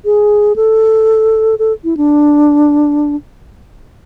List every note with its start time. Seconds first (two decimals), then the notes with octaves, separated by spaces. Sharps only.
0.05 G#4
0.56 A4
1.59 A4
1.84 E4
1.97 D4